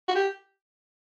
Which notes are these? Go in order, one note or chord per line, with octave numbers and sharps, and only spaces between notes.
F#4
G4